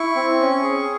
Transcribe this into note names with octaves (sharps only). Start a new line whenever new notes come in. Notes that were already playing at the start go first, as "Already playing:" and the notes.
Already playing: E4 C#6
C4
C#4
G#4